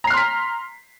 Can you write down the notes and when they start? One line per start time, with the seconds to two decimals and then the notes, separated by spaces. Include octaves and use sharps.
0.04 A#5
0.07 C7
0.10 F6
0.14 C6
0.17 B6